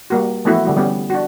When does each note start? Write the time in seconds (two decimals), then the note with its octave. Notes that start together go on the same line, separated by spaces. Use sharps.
0.10 G3 A#3 F#4
0.45 E3 F3 A3 B3 E4 F#4
0.65 D3 G3 F#4
0.77 G3 B3 C#4
1.10 D4 F#4